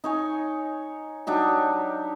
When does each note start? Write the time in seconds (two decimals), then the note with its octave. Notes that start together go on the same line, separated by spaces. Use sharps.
0.04 D#4 C#5 G#5
1.27 F#3 D4 D#4 G4